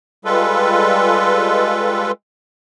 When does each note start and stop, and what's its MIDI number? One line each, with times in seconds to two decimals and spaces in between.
0.25 2.11 55
0.25 2.11 56
0.25 2.11 65
0.25 2.11 69
0.25 2.11 71